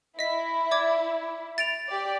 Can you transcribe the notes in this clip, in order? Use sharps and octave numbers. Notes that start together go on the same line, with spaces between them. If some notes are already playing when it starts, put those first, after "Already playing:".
E4 D#5 B6
D5 D6 G#6
A6 D7 F7
G4 D5